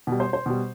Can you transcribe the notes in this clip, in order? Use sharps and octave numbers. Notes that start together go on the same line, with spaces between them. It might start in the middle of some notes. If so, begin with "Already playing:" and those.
B2 G3
C5
C5
B2 G3